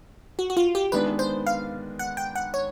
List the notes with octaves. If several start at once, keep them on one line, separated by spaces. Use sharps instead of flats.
F#4
F#4
F4
G4
D#3 G#3 B3 D4 B4
C5
F5
F#5
G5
F#5
C#5